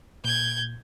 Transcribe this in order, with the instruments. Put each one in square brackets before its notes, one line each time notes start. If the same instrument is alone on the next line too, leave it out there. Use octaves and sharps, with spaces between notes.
[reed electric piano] A#2 [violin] G6 G#6